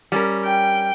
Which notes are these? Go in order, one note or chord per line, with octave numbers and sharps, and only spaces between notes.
G3 C#4 A#4
G5